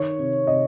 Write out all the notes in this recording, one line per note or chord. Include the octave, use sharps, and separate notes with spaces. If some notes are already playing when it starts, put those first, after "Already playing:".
Already playing: D#3 C#5
C3
C3 D#5